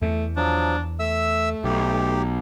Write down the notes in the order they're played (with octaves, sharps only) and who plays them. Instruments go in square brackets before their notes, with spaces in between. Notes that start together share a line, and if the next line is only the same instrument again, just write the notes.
[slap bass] E2 [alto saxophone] A3
[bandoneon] F3 F#3 [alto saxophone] D4
[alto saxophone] A3 [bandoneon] E5 E6
[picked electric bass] B1 [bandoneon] G4